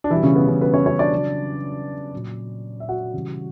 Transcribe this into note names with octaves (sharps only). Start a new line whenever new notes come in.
D4
B2 E3 G3 E4
C#3 C#4
B3
C#3 C#4
B3 B4
C#4 C#5
C#4 C#5
D4 D5
C#3 F#3
A#2 F#3
E5
F#4 F#5
C#3 E3 G3